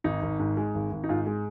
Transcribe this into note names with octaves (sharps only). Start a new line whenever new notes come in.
G#1 D#4
G#1
G#2
G#3
G#1
G#1
D#4
G#2 F4
G#3